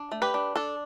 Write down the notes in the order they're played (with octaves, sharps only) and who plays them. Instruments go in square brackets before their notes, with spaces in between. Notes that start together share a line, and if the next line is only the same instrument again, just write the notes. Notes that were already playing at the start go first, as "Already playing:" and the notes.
Already playing: [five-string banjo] D4
A3
G4 B4
D4
D4 A4